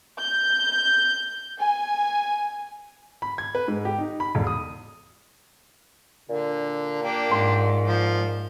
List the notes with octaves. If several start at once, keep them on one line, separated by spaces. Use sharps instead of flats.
G6
G#5
B5
G#6
B4
G#2
G4
D#4
B5
E1
D#6
A#2 D3
A#3 D4 G4
G#2 D#5 C6
F3